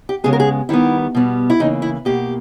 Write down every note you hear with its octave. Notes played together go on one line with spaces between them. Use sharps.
G4
C#3 G#3 B3 G#4
A#4
G#4
D#3 G3 B3 E4
B2 G3 B3
E4
C#3 E3 A#3 D#4
E4
B2 A#3 G4